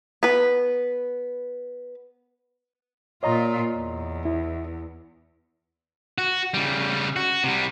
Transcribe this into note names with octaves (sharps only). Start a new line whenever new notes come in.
B3 B4
A#2 F4 C#5 D#5 A#5
E2
E4
F#4
C#3 G3
F#4
C3 G3